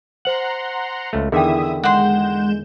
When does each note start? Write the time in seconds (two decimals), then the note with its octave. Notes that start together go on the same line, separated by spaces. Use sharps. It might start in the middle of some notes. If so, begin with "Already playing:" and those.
0.25 C5 F#5 A#5 C6 F#7
1.13 C#2 A3
1.32 E2 D3 D#3 E4 G#4 E5 G5 D#6
1.84 G#3 F#5 C6 G6 E7